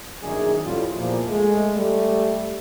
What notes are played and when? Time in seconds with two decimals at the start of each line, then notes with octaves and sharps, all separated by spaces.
0.23 A#1 F#2 D#3 D4 G#4
0.65 A1 F2 A2 F#3 G3 F4
0.96 E2 A#2 F3
1.29 G#3 A3
1.74 G3 A3